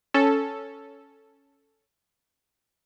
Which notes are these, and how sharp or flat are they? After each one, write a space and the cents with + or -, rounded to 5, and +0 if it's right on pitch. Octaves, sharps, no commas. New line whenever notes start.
C#4 +0 A4 +0